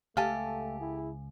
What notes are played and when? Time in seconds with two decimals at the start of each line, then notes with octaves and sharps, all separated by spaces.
0.17 C#2 A3 G4 A4 F5 G#5
0.79 E4 G#4